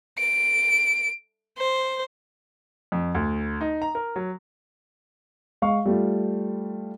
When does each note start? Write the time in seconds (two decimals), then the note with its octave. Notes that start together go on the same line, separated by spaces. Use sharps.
0.19 D7
1.58 C5
2.92 F2
3.15 D2
3.61 D#4
3.82 A#5
3.95 A#4
4.16 F#3
5.62 G#3 F5 C#6
5.86 G3 A3 F4